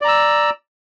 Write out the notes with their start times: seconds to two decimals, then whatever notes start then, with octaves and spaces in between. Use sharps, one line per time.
0.02 D5
0.05 A#5
0.08 E6